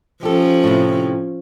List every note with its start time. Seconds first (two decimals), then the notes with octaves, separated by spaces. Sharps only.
0.23 F3 C#4 G4 A4
0.64 A2 C3